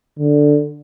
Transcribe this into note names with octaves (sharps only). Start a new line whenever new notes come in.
D3